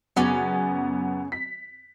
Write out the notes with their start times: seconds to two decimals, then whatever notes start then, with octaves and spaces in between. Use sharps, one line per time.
0.16 F#2 C#3 B3 C#4 D5
1.32 B6